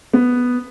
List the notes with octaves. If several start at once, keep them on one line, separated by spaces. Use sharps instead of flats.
B3